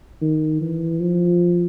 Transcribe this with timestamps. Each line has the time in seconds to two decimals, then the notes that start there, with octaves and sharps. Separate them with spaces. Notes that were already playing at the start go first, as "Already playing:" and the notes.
0.21 D#3
0.61 E3
1.00 F3